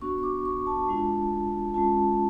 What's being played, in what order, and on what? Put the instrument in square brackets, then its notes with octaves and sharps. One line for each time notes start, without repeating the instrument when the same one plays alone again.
[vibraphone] B3 D4 F#4 C#6
C#6
D6
C#6
A5
G#3 D4 F4
G#3 C#4 F4 A5